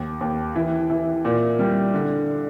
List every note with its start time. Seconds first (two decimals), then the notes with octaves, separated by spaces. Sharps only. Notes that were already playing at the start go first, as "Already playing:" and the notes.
Already playing: D#2
0.21 D#2
0.55 E3
0.90 E3
1.25 A#2
1.59 G3
1.94 D3